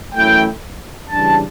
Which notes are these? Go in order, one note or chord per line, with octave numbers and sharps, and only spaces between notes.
F#2 E3 A3 C#4 E4 G5
C#3 E3 G3 D4 A5